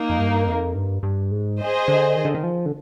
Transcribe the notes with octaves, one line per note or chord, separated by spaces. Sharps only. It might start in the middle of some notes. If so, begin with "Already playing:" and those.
Already playing: A#3 D#4 A#4
F2
G2
F2
G2
G2
G#2
G#4 C5 D#5
D3
D#3
D3
D#3
F3
D3